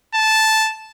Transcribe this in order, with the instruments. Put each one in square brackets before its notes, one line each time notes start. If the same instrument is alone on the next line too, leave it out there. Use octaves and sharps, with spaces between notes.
[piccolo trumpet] A5